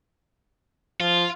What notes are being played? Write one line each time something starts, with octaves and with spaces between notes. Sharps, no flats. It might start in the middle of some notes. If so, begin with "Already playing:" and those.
F3 F4